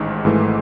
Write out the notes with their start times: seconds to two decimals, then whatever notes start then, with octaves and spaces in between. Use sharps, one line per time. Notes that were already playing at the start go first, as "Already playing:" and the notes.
Already playing: A1 G#2 D#3
0.24 G#1 G#2 E3 A3